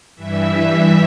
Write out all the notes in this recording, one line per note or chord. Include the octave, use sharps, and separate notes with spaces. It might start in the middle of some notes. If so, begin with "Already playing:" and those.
G2 E3 E5
E5